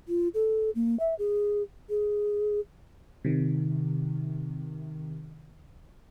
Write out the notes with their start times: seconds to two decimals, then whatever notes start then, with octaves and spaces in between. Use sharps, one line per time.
0.08 F4
0.34 A4
0.75 A#3
1.00 E5
1.19 G#4
1.90 G#4
3.25 C3 D#3